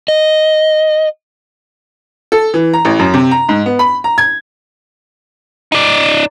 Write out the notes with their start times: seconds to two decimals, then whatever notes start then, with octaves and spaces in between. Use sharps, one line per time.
0.08 D#5
2.32 A4
2.54 E3
2.73 A#5
2.85 A1
2.99 F#2
3.14 C3
3.31 A#5
3.49 G#2
3.66 B3
3.79 B5
4.04 A#5
4.18 G#6
5.72 D#4 D5